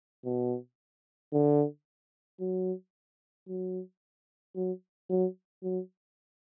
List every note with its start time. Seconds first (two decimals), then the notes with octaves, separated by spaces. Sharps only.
0.25 B2
1.33 D3
2.40 F#3
3.48 F#3
4.55 F#3
5.09 F#3
5.63 F#3